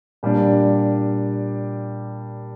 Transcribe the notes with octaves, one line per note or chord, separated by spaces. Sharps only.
A#2 G3 D4